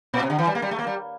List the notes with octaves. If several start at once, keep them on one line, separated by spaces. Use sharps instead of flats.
A#2
C3
D3
E3
G3
A#3
G3
A3
A#3
G3